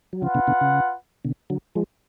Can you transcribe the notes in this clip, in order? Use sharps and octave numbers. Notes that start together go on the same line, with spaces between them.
F#3
C#3 F3 F4 B4 F#5
B2 D3
B2 D3
C#3
B2 D3
D3 F#3
F3 G#3